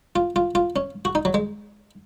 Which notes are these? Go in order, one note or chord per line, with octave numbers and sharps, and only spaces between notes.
F4
F4
F4
C#4
F#4
D#4
F#3
G#3